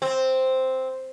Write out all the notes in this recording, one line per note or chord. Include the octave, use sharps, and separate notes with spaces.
C4